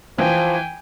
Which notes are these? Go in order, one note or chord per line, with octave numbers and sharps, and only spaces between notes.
E3 F3 G5 G#5